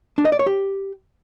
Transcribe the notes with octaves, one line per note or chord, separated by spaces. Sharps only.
D4
D#5
D5
C#5
G4